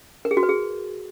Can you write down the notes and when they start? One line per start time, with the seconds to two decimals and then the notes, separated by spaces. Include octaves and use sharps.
0.25 A#4
0.31 G#4
0.37 F#4
0.43 B4
0.49 G#4